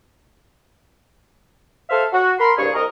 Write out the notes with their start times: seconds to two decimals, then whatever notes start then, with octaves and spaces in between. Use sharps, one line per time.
1.90 A4 C5 E5 F5
2.13 F#4
2.39 A#4 B5 C6
2.57 C2 G2 A#2 G#4 C#5 C#6
2.74 C2 A#4 D#5